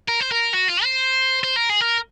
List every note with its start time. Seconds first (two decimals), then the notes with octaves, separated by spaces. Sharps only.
0.09 A#4
0.20 C5
0.32 A#4
0.53 F#4
0.69 F4
0.84 C5
1.44 C5
1.56 A#4
1.70 G#4
1.81 A#4